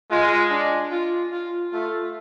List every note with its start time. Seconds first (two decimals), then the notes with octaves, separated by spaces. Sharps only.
0.11 G#3 F4
0.51 D4
0.91 F4
1.32 F4
1.73 A3 F4